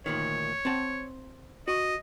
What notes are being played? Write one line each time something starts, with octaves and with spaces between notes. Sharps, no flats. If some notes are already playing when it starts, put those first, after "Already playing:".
D2 A#2 D#3 C#5
C4 F#5 A5
F#4 D#5